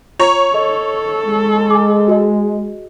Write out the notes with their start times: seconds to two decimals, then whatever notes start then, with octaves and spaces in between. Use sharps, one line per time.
0.19 F4 C#5 A#5
0.54 A4 D#5
1.26 G#3
1.70 G#5 D6
2.08 F#4 G#4 D#5